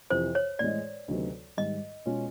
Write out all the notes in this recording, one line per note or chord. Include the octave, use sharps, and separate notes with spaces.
F2 C3 E3 C5
C#5
A2 E3 G#3 D5
D2 C3 D#3 F#3 B3
G#2 D#3 G3 D#5
B2 G#3 C#4 F4